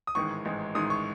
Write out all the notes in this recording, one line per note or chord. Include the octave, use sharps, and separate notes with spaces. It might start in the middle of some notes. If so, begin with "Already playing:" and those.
D#6
A1 G#2 D#3 G#3 C#6
A1 G#2 D#3 G#3
A1 G#2 D#3 G#3 D#6
C#6